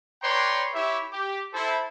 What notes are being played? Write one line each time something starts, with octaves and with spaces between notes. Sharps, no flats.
B4 C#5 D5 G5 A#5 C6
E4 G4 C#5 E5
G4
E4 A4 C5